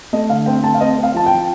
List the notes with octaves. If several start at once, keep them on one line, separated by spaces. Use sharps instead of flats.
A3 D#5
D3 F5
C4 G5
A3 A5
F5
C4 D#5
C4
F5
F3 A5
G5
F3